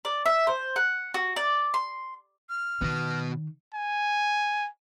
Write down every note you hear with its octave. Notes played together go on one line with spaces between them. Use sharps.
D5
E5
C5
F#5
F#4
D5
C6
F6
B2 D#3 B3
G#5